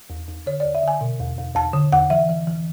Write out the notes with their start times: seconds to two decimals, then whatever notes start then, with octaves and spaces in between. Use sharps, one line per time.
0.10 E2
0.28 E2
0.46 D3 C#5
0.60 E2 D5
0.75 E5
0.83 D3 G#5
1.01 B2
1.20 E2
1.38 E2
1.55 E2 A5
1.74 D3
1.92 E2 F#5
2.10 E3 E5
2.29 E3
2.47 E3